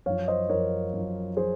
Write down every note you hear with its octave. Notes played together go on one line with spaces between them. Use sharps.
F#2 F3 C#5 F5
C5 D#5
F#2 F3 A#4 C#5
F#2 F3
F3 G#4 C5